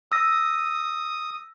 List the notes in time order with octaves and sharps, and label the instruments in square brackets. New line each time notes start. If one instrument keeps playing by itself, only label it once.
[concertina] D#6 [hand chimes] E6 A#6